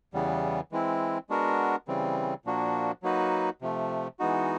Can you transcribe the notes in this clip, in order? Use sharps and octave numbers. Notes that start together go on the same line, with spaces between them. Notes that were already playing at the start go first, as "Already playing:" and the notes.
E2 C#3 E3 G3 B3
E3 G#3 C4 E4
G#3 B3 D4 F#4 A#4
C#3 E3 G3 C4
A#2 F3 A#3 D4 F#4
F#3 A#3 D#4 F#4 B4
C3 F3 A3
E3 G#3 B3 D#4 F#4